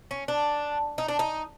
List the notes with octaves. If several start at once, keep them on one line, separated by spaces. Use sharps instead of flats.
C#4
D4
D#4
D4
D#4